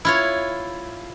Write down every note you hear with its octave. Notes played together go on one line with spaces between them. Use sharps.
E4 F4 C#5